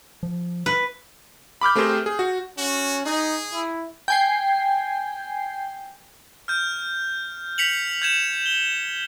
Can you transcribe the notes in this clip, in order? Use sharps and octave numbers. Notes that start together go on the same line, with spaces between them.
F3
B4
B5 D6 F6 G6
A3 C4 G4 G#4 A#4 C5
G#4
F#4
C#4 F#4
D#4 G#4
E4
G5 G#5 C7
F6 G6
B6 C#7 F7 F#7
G6 G#6 E7
G7